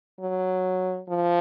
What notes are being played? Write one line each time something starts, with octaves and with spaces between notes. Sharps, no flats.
F#3
F3